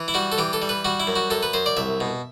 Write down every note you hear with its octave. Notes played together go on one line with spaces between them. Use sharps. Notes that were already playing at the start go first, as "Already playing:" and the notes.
Already playing: E3
E4
G3 F#4
A4
E3 G4
A4
G3
B4
G3 F#4
E4
F#2
F#4
F#2 A4
B4
F#2 C5
D5
C2 E5
B2